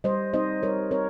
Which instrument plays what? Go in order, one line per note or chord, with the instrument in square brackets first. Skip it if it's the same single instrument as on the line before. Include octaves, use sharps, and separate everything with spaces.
[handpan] G3 C5 D#5
C4 D#4 C5 D#5
G3 A#4 C#5
C4 A#4 C#5